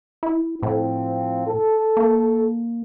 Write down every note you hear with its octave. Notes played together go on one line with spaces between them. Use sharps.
E4
A2 F3 C4
A4
A#3